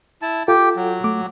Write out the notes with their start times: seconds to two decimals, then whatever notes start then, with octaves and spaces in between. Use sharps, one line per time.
0.22 E4 A5
0.48 F4 G4 A4 G5
0.76 F#3
1.04 A3 D6